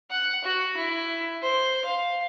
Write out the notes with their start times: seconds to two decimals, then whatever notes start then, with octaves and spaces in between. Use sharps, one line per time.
0.11 F#5
0.44 F#4
0.77 E4
1.42 C5
1.85 F5